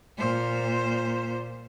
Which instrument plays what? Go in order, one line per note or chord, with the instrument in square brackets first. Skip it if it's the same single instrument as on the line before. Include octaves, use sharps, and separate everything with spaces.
[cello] A#2 C5